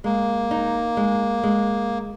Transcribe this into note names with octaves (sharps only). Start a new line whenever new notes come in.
G#3 A#3
D#4
G#3
G#3